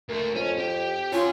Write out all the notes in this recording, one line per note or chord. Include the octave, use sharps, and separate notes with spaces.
D2 A3 A#3
F2 C#4
G4 G5
C#4 F4 F#4 G#5